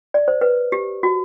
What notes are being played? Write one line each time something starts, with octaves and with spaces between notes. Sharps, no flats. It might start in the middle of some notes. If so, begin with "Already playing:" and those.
D5
C5
B4
G4
F#4